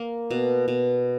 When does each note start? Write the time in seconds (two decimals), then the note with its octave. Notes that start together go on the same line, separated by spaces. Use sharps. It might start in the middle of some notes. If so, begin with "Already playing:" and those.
Already playing: A#3
0.31 B2
0.68 B2